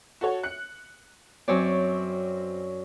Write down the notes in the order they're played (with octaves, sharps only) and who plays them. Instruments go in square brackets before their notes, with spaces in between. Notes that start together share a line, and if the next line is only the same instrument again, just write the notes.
[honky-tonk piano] F#4 A4 C#5
F#6 C#7
[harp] F#2 C#5 D5 [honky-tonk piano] C4